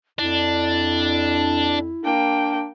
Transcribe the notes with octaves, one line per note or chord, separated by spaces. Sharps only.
F2 D4 E4
A#3 D4 G5